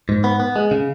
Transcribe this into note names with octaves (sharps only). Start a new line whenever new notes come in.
G#2
B3
B3
G#3
C#3